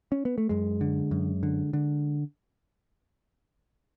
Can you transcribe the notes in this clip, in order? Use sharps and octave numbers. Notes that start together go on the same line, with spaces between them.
C#4
B3
A3
F#2 G#3
D3
F#2
D3
D3